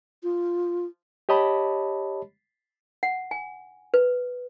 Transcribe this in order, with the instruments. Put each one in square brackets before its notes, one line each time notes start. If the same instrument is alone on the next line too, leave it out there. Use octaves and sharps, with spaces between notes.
[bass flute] F4
[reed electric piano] G4 C#5 D#5 A5 B5
[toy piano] F#5
G#5
B4